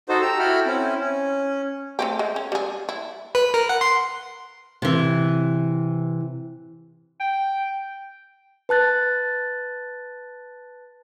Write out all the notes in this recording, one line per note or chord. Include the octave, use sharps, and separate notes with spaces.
D#4 F#4 A4 C5
G4 A#5 E6
E4 F#4 A4 G5 B5 F6
C4 C#4 E4
C#4
A3 C4 G4
G#3
C#4
G3 G#4
E4
B4
A#4
F#5
C6
C3 E3
G5
B4 A5 F#6 A6